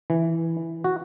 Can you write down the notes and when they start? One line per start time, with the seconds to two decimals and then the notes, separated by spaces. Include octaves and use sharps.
0.10 E3
0.84 F#4